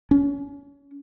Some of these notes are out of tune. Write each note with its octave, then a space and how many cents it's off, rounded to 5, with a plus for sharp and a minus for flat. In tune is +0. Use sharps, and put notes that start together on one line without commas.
C#4 +30